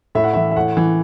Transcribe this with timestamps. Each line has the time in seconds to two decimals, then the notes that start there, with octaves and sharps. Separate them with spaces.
0.15 A2 E5
0.24 F#5
0.33 E3 E5
0.51 E5
0.56 A2 F#5
0.77 E3